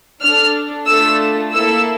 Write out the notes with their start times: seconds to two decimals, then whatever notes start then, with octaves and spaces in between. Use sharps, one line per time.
0.22 D4 A4 F6
0.87 A3 D4 F4 A4 E6
1.53 A#3 E4 A4 E6